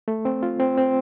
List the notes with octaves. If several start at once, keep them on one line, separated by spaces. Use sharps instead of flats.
A3
C4
F4
C4
C4